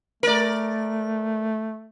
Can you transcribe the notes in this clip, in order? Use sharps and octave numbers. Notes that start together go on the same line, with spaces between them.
A3 A#4 D5